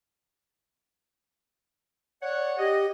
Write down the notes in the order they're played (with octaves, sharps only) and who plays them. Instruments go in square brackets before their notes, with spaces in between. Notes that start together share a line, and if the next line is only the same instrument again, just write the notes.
[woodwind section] C#5 F#5 [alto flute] D5
[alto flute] G4 [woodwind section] D#5